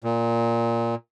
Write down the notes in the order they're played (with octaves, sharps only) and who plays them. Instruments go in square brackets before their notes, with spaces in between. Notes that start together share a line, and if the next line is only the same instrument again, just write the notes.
[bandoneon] A#2